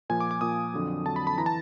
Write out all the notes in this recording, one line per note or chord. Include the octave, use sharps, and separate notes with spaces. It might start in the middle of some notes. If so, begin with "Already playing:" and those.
A#2 F3 G#5
D6
D6
A#2 F3 D#6
F2 D3 F#3
F2 D3 F#3 A5
B5
B5
E3 A#5
A5